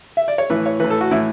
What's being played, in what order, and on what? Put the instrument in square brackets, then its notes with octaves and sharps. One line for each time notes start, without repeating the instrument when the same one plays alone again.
[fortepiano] E5
D5
C#5
A2 E3 B4
C#5
A2 E3 B4
A4
F#4
A2 E3 E4